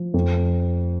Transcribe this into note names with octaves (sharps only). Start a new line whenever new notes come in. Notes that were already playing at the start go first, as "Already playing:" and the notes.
Already playing: F3
F2